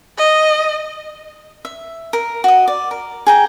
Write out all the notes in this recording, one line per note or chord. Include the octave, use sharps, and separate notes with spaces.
D#5
E5
A#4
F#4 D#5
D5
A#4
G#4 G5 A#5